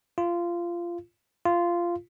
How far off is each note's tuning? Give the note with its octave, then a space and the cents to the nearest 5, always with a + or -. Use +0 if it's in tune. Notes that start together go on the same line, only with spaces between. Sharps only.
F4 -15
F4 -10